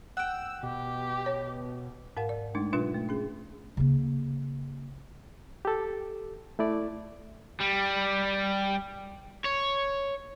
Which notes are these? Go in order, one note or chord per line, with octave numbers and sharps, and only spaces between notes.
F#5 G5 E6
B2 G4
C#5
G#2 A#4 F5 F#5
D5
G#3 A3 D4 D#4
B2 F#3 D4 F4 B4
A3
C#4 G#4
C#3 A#3
G4 A4
A3 E4 D5
G3
C#5